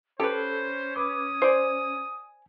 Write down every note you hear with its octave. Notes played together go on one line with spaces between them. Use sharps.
C#4 G4 A4 B4 C5
B4 D6 D#6
C5 D5 G#5